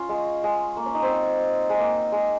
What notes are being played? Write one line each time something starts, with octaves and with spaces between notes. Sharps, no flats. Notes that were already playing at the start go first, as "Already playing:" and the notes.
Already playing: C#4 F4
G#3
G#3
A#3
C#4
D#4
C4
G#3
A#3
G#3